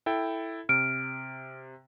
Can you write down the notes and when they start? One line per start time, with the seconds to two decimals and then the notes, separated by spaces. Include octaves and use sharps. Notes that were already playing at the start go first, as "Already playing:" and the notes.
0.06 E4 A4 G5
0.69 C3 F6 D7